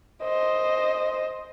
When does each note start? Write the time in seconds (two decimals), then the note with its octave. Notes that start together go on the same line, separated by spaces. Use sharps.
0.24 C5 D#5